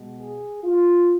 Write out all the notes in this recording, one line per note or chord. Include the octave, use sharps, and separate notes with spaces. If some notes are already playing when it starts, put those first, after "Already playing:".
Already playing: B2 G#3 B3
G#4
F4